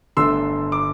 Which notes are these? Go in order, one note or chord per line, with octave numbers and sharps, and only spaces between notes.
G1 G2 D3 A3 C6 E6
D6